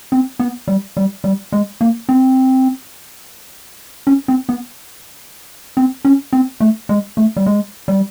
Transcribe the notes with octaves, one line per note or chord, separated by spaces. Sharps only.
C4
B3
G3
G3
G3
G#3
A#3
C4
C#4
C4
B3
C4
C#4
C4
A3
G#3
A3
G3
G#3
G3